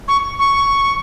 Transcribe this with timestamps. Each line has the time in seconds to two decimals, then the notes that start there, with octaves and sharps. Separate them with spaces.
0.08 C#6
0.39 C#6